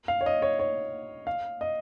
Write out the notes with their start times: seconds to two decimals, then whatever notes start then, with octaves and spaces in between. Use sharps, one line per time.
0.08 F5
0.21 C#5
0.26 D#5
0.42 C#5
0.59 C#5
1.27 F5
1.61 D#5